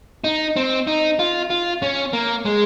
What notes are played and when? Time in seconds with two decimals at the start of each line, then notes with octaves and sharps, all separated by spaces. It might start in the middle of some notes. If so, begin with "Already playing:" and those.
0.24 D#4
0.56 C4
0.87 D#4
1.19 F4
1.50 F4
1.82 C#4
2.13 A#3
2.45 G#3